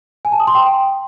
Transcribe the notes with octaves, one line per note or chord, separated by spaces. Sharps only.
G#5
A5
D#6
C6
G5